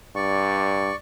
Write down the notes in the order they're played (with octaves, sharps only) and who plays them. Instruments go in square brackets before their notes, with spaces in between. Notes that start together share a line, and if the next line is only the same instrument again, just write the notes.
[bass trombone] G2 [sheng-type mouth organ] D5 C#6